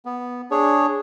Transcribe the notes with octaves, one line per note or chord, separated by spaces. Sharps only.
B3
D4 G#4 C#5